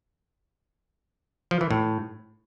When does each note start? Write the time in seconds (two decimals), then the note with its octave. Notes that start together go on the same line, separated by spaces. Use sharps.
1.51 F3
1.61 E3
1.71 A2